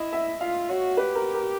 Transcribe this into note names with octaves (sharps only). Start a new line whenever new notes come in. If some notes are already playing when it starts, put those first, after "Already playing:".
Already playing: E4 D#5
E5
F4 F5
F#4 C#5
G4 B4
A#4
A#4